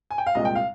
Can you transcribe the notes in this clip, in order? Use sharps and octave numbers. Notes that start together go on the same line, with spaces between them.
G#5
G5
F5
C2 A#2 G#3 D#5
G5
F5